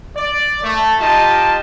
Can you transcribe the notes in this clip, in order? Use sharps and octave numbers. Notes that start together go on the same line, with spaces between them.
D5
A3
D#4 F4 G4 D#5 A5